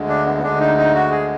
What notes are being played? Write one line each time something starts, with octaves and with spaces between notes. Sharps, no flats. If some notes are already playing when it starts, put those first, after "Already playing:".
Already playing: D2 D3 G#3
D4
B3
B3
D2 D3 G#3 D4
D#4
D#4
F#4
G#4